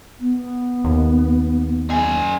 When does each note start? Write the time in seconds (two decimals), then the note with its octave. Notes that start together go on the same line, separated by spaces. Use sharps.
0.20 B3
0.84 D#2
1.91 F#2 G#4